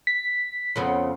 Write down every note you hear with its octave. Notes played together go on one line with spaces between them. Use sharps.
B6
F2 C#3 B3